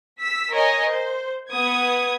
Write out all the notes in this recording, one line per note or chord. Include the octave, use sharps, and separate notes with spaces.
E6 B6
A#4 C#5 D#5 G#5
C5
B3 D#6 G#6